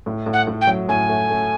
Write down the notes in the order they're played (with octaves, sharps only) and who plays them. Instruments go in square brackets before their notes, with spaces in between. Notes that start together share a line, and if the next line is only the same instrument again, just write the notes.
[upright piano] A2
A2
[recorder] F#5
[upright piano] A2
[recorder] G5
[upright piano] F#3
[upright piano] A2 [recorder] G#5
[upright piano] A3
A3